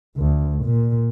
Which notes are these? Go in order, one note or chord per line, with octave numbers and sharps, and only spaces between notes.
D2
A#2